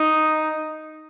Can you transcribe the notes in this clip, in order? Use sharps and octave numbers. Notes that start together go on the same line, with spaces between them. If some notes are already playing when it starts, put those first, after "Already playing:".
Already playing: D#4